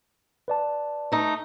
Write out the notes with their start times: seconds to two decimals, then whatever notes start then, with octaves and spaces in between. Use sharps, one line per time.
0.48 B4 D5 A5
1.12 A3 D#4